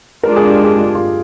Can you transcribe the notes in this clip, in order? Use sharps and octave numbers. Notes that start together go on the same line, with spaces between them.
G#3 D4 F4 A#4
G#4
G4
G#4
F4